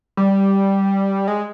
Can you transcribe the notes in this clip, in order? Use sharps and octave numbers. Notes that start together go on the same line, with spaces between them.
G3
G#3